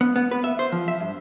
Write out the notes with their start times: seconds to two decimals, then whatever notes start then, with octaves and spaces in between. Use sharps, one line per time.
0.01 B3
0.16 B3
0.31 B4
0.44 E5
0.59 C5
0.72 F3
0.88 E5
1.00 G2